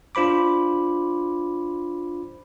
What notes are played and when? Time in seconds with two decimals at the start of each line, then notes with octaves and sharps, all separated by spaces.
0.15 D4 F4 C5 B5 D6